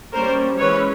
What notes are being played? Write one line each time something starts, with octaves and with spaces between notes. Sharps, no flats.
G3 A#3 C#4 A#4 C5
E3 G#3 C#4 B4 C#5